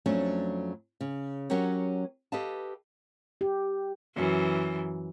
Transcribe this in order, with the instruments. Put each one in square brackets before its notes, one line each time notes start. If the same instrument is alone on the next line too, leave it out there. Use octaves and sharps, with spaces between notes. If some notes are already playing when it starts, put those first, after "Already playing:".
[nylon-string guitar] F2 F#3 A3 C#4 D4
C#3
F#3 C#4 F#4 G4 A#4 C#5
G4 A4 B4 D#5 F5 A5
[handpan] G4
[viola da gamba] F#2 E3